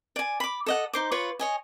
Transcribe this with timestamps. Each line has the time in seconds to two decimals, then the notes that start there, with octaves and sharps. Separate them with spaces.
0.16 D5 G#5
0.40 B5 D6
0.66 A4 D#5 F#5
0.93 D#4 C5 D6
1.12 F4 B4 C#5 C#6
1.39 C#5 D#5 G#5